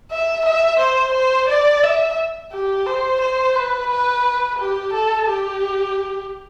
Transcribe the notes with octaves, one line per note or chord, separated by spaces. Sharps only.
E5
E5
C5
C5
D5
E5
G4
C5
C5
B4
B4
G4
A4
G4